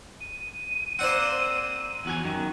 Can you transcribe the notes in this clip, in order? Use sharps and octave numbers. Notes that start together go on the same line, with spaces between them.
D#7
A#3 C4 C5 D5 F#5
E2 F#4 G#5
F#2 D#3